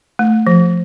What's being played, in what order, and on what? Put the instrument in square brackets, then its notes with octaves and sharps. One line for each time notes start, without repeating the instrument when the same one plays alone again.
[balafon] A3
F3